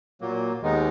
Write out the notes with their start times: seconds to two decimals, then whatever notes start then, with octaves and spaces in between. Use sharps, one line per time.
0.21 A#2 F#3 A#3
0.62 D#2 D#3 G#3 B3 D#4